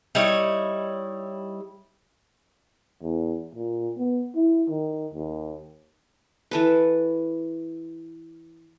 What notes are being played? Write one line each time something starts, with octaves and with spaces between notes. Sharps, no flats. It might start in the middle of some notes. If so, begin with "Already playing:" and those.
G3 D#4 E4 C#5
E2
A#2
B3
E4
D#3
D#2
E3 A4 B4